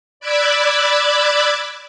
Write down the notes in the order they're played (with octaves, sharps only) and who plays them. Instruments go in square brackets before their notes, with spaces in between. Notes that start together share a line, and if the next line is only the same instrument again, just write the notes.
[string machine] D5 B5 D6 E6 F#6 G#6